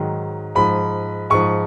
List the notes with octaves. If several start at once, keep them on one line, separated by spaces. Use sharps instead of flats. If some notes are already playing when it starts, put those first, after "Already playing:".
Already playing: G#2 D#3 F#3
G#2 F3 B5
G#2 F3 C#6